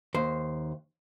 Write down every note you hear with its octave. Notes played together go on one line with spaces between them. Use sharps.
D#2 C5